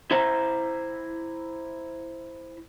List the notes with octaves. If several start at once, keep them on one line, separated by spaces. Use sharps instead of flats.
E4 C5 A#5